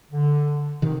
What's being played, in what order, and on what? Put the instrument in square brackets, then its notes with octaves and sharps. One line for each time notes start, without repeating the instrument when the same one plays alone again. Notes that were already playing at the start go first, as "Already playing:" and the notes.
[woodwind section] D3
[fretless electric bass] C3 D#3